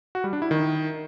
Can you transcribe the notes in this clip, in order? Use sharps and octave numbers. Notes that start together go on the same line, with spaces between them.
F#4
G3
D4
E4
D#3